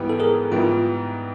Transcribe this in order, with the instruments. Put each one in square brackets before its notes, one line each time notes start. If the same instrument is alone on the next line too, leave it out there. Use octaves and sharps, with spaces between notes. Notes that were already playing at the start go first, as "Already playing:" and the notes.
Already playing: [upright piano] G#2 E3 G3 B3
[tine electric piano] A4
G#4 A#4
[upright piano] G#2 E3 G3 B3 [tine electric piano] F4